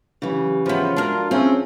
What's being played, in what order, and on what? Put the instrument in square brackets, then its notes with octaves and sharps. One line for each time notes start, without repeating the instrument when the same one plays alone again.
[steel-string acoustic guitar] C#3 E3 [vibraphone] F#3 G4
[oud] F3 B3 [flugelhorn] F4 [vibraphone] G#4 C#5 E5
[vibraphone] G#3 F#4 [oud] D4 A#4
[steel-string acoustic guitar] C4 [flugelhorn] C#4 [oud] F4 [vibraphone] G#4 E5 E6